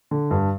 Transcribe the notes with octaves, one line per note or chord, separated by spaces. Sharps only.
D3
G2